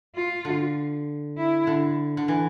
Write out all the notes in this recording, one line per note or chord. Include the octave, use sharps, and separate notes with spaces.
F4
D3
E4
D3
D3
E3